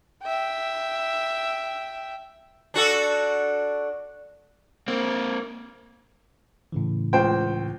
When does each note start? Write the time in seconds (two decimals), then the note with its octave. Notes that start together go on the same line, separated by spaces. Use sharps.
0.23 E5 G5
2.74 D4 F#4 A4
4.88 A#3 C4
6.72 A2 C#3 E3
7.13 C#2 C5 G5